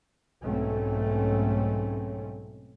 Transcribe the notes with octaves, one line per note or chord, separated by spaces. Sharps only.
B1 G#2 A3 C4 C#4